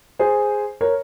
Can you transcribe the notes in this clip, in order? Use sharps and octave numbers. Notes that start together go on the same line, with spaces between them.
G#4 C5
A#4 C#5